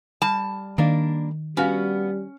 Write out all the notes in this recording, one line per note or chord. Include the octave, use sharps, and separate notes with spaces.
G3 A5
D#3 A#3 D4
G3 B3 C#4 F#4 F5